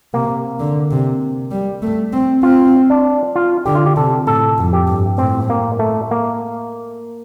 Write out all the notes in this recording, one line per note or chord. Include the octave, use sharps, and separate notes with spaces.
C3 A#3
D3
C3
G3
A3
C4
C4 F4
D4
F4
D3 G4
F4
G4
C3 A4
A2 A4
F2
G4
G2
A2 C4
A#3
A3
A#3